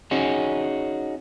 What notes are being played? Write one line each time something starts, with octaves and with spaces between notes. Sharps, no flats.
C#4 D#4 F#4 G#4